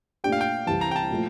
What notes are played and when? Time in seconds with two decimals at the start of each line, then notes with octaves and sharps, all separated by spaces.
0.24 A#2 A3 D4 G4 G5
0.32 F5
0.41 G5
0.67 C2 C3 E3 A5
0.81 A#5
0.91 G5
0.96 A5
1.10 A#2 F3 A3